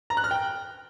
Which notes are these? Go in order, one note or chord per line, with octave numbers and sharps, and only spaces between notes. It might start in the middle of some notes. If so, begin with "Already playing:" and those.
A#5
F#6
F6
G5